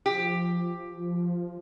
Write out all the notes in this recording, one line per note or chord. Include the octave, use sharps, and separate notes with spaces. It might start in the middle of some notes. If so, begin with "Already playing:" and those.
F3 G4